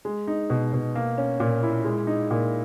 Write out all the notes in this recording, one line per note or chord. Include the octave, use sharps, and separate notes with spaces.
G#3
D#4
B2
B2
A#3
C#4
A#2
E4
G#3
D#4
A#2